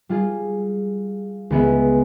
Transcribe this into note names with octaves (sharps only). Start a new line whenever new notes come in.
G3 F4 G#4
C#2 E3 B3 G#4 E5